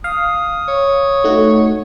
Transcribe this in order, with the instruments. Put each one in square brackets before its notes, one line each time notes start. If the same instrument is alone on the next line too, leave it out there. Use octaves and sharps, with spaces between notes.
[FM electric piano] F5 [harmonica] D#6
[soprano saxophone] C#5
[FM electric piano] A3 D#4 F#4